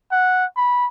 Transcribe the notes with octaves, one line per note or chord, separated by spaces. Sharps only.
F#5
B5